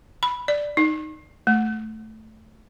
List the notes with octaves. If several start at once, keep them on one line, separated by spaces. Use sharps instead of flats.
B5
D5
D#4
A3